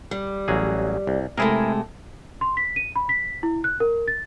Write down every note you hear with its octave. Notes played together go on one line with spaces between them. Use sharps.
G3
A1 F#3 G#4
C2
C3 G#3 A3 E4 G#4 A#4
C6
B6
D#7
B5
B6
E4
F#6
A#4
A6